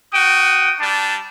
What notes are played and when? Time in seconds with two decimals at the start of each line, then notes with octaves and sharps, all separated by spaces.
0.13 F#4 G5 D#6
0.79 G3 D4 A5